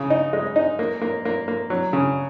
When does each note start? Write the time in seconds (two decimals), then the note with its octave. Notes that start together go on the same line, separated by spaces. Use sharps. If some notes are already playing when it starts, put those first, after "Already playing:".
Already playing: C#3
0.10 D#4
0.33 G#3
0.56 D#4
0.79 A#3
1.02 A#3
1.25 A#3
1.48 A#3
1.70 F#3
1.93 C#3